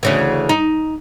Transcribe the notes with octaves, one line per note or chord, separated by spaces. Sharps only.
D2 C#3 E3
D#4